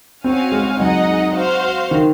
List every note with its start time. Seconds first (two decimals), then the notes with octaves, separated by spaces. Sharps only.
0.24 C4 C#4 F#4 C#5 F5 G#5
0.52 G#3
0.79 F#3 D#4 G#4 D#5 F#5
1.35 F#4 C5 F5
1.91 D#3